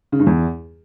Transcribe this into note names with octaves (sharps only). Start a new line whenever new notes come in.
C#3
G2
E2